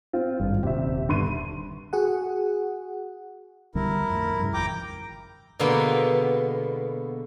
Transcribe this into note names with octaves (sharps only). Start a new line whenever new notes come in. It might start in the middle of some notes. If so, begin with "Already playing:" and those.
C4 F4
G#1 G2
D#1 C3 G4 E5
G2 D3 C6 D#7
F#4 G#4 F#5
B1 D3 G3 E4 A#4
F2 A2
G2 C#3
G#1 F2 G5 A#5 D6
B2 D3 G#3 A#3 B3